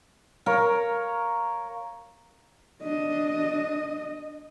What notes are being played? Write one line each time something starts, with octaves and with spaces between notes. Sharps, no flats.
A#4 C#5 F5 A#5
D4 D#5